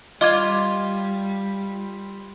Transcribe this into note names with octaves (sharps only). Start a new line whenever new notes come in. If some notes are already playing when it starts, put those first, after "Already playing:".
G3 F4 D#5 D6 G#6